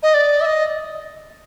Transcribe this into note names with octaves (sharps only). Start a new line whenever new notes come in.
D#5
D5
E5
D#5